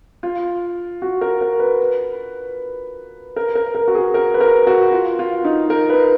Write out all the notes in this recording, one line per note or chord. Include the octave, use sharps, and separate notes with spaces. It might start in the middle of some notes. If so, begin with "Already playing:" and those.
F4
F#4
A#4
A#4
B4
A#4
A#4
A#4
F#4
G#4
A#4
B4
A#4
F#4
F4
F4
D#4
A#4
B4